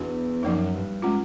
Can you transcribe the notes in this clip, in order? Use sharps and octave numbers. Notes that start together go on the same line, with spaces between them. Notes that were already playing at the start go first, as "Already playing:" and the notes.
Already playing: E2 B3 D4 F#4
F#2 F3 A#3 D#4
G2
G#3 C#4 F4